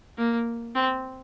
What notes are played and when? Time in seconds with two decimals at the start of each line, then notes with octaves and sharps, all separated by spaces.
0.18 A#3
0.75 C4